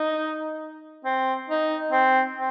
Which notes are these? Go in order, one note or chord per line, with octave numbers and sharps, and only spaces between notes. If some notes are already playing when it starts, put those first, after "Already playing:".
Already playing: D#4
C4
D#4
C4
C4